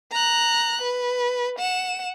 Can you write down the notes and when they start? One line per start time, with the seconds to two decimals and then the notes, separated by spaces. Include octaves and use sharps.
0.12 A#5 F#6
0.82 B4
1.59 F#5 E7